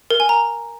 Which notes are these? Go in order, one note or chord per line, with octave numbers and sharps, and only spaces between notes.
A#4
G#5
A#5